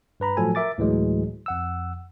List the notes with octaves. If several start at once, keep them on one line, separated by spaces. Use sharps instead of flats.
G2 B4 A#5 B5
A2 F3 F#3 A3 A4 G#5
A#4 E5 D6 A6
D2 A2 E3 F#3 G#3
F2 F#5 E6